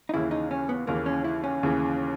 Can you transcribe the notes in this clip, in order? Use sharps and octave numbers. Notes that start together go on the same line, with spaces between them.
D#4
D#2 C#3 E3 E4
D#4
C#4
B3
D#2 C#3 E3 A#3
C#4
E4
C#4
D#2 C#3 E3